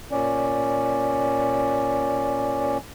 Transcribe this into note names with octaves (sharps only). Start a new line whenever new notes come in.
A#2 C#4 D5